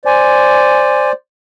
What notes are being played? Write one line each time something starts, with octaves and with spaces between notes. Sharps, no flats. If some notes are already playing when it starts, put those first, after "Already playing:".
C5 D5 G#5